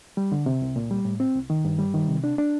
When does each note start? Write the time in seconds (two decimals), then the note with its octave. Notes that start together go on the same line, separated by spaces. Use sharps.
0.17 G3
0.32 D3
0.46 C3
0.62 C2
0.76 A#2
0.91 G3
1.05 A2
1.20 C4
1.35 C2
1.50 D#3
1.65 G2
1.79 G3
1.94 D#3
2.09 C3
2.24 D4
2.38 D4